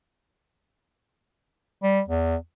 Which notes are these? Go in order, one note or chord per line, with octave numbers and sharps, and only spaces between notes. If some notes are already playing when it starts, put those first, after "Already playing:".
G3
E2